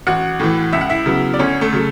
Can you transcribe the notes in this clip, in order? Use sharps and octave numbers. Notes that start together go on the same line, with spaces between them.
A1 F#4 F#5
A2 E3
C#2 E5
F#5
E4 E5
C#3 F#3 B3
D5
D2 C#4 C#5
A3 A4
C#3 F#3